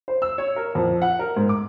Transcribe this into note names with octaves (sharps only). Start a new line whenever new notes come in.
C5
E6
C#5
A#4
F2
F#5
A#4
G#2
D6